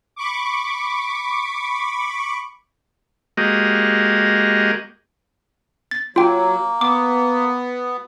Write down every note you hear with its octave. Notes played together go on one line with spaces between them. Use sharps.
B5 C#6 D6
G#3 A#3 F#4 G4 D#5
A6
F#3 A#3 F4 G5
B3 D6